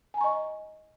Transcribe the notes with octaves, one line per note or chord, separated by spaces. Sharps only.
D#5 G#5 A#5 C#6